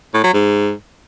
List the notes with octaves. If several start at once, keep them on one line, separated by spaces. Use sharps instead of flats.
A2
F#3
G#2